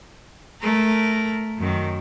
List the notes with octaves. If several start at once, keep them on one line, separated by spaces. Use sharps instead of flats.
A3 A#4
F#2 D#3